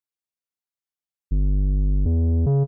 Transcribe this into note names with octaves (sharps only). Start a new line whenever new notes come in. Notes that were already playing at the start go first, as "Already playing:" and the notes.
G1
E2
C#3